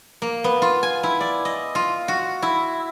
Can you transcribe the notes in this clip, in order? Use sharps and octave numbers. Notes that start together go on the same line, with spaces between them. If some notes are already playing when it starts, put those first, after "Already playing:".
A#3
B3
F4
G#5
E4
D5
D#5
F4
F#4
E4